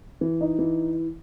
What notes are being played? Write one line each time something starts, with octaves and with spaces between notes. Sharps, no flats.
E3
D#4
E3